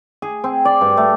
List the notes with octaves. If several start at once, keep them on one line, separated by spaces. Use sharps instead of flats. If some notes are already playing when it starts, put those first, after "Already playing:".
G#4
C4
D5
G2
A3